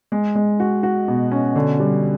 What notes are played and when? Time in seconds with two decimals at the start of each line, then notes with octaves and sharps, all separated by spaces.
0.12 G#3
0.35 G#3
0.60 F#4
0.83 F#4
1.08 B2
1.31 C#4
1.56 D3
1.80 G3